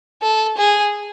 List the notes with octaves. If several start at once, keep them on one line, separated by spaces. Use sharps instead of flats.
A4
G#4